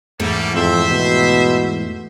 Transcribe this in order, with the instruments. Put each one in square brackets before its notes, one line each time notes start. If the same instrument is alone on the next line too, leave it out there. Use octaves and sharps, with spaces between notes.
[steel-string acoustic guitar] E2 G#2 A3 [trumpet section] G3 A#3
[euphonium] F2 [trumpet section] C5 E5
[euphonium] B2